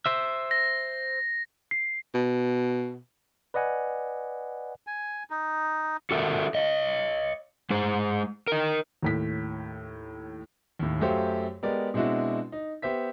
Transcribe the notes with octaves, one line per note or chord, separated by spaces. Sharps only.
C5 E5
A#6
C7
B2
B4 D5 D#5 F#5 G#5
G#5
D#4
F#4 A4 A#4 E5
C#5 D#5
G#3 G#4 C5
A#4 D#5
D#2 A2 B6
D#2 A2
F#2 F#3 A3 G4 C5 F5
G#3 B3 G4 A#4 D5
B2 G#3 C4 D4 E4 F#4
D#4
B3 G4 C5 E5 B6